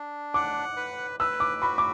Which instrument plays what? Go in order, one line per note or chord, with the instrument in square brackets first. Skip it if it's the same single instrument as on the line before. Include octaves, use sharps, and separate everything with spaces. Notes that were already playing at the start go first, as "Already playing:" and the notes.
Already playing: [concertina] D4
[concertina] F#5 [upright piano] D6
[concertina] B4
[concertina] B4 [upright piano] E6
[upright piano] D6
[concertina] F#4 [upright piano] B5
[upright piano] D6